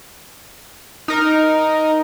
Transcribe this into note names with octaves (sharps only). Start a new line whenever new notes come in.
D#4 A#4